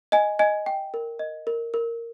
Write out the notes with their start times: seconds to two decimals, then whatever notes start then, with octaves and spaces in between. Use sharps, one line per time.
0.12 D#5 G#5
0.39 D#5 G#5
0.66 G5
0.94 A#4
1.19 D#5
1.47 A#4
1.74 A#4